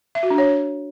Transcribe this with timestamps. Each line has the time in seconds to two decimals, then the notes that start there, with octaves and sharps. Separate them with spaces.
0.15 E5
0.23 F#4
0.30 D4
0.38 C#5